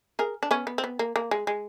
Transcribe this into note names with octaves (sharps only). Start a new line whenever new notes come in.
G#4 A#4
D4
B3 C#4
B3
C4
B3
A#3
A#3
G#3
G#3